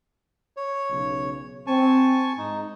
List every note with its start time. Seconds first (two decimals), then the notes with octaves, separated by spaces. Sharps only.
0.57 C#5
0.90 B1 C#3
1.67 C4 G#5 A5 C#6
2.38 G#2 D#4